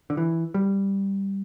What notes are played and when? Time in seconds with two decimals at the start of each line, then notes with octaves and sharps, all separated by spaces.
0.10 D3
0.17 E3
0.54 G3